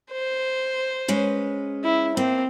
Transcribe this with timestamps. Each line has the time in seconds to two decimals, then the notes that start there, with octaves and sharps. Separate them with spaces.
0.12 C5
1.08 G#3 C#4 B4
1.84 E4
2.17 A#3 C4